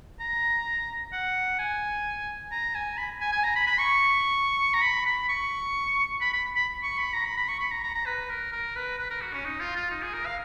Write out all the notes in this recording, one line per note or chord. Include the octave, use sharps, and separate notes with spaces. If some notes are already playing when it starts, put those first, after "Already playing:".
A#5
F#5
G#5
A#5
G#5
B5
G#5
G#5
A#5
B5
B5
C#6
A#5
B5
B5
C#6
B5
B5
B5
C#6
B5
A#5
B5
B5
C#6
B5
A#5
A#5
A#5
B4
A#4
A#4
B4
B4
A#4
F#4
C#4
D#4
F4
F4
D#4
G#4
A#4
F5